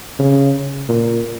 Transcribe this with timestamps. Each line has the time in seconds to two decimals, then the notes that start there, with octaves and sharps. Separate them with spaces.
0.19 C#3
0.88 A#2